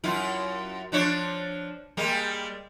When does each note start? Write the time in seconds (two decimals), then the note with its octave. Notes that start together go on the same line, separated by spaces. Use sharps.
0.04 F#2 E4 F4
0.92 F3 D4 C#5
1.97 G3 G#3 A#3